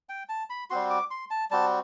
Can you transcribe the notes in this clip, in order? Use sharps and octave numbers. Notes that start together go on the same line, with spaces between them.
G5
A5
B5
G3 C4 F#4 C6
D6
C6
A5
G3 C4 F#4 A5